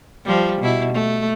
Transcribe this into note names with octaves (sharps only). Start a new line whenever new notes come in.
F3 G3
B2 E4
A3